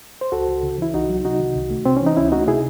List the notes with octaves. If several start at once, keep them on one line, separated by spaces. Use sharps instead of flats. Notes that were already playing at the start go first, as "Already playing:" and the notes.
C5
C#2 F#4 A4
C#2
C#3
E3 E4
C2 D#4 F#4
F#3
C3 D#4 F#4
D#3
C2
A3
C3 C4
E3 C#4
D#4
C#2 C#4 E4
A3 D#4 F#4
C3 E4 G#4